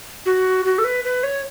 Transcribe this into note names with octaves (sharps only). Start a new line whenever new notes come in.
F#4
F#4
A4
B4
B4
C#5